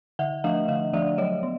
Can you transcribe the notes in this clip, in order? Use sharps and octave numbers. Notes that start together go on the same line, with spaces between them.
D3 E5 F#5
F3 A3 D4 D#5 F5
D3 D#5 F5
F3 A3 D4 D5 E5
F#3 C#5 D#5
B3